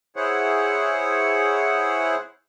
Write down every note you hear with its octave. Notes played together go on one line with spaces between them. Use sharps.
E4 G#4 C5 C#5 F#5